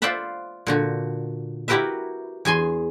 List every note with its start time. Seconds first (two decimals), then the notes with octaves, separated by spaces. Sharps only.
0.02 F4 C5 D5 E5 F#5 B5
0.67 A#2 D3 F#4
1.68 E4 F#4 G4 A#4 B4 E5
2.45 E2 G#4 G#5 C6